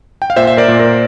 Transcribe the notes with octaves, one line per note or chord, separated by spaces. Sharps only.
G5
F5
A#2 C5 E5
E5
A#4 D5
A#2
A#4